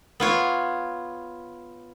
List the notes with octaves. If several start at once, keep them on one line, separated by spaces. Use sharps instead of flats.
B3 F4 C#5